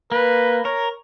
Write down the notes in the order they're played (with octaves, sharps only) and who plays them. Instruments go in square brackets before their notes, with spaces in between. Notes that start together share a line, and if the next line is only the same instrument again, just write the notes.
[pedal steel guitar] A#3 [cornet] B4
[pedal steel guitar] A#4 [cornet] C#5